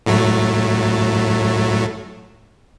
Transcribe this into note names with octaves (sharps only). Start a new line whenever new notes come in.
A2 F#3 A3